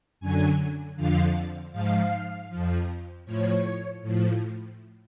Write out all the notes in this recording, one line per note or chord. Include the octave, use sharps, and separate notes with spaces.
F#2 D3 F#3 G#5
F2 D3 F3 F5
G#2 F3 F5
F2 F3
A2 F3 C#5
A2 F3